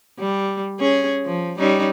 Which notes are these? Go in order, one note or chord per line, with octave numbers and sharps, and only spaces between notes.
G3
C#4 G#4
F3
G3 C#4 D#4